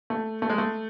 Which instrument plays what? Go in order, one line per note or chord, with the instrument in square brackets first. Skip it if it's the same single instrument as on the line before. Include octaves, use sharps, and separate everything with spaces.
[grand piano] A3
A3
G#3
A3